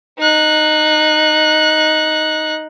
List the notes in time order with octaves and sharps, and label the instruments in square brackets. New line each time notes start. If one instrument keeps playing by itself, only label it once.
[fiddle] D#4 F#6